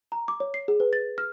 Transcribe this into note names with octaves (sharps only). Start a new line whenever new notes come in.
A#5
D6
C#5
C7
G#4
B4
A6
F6